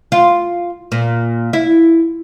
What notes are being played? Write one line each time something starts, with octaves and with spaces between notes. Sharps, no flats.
F4
A#2
E4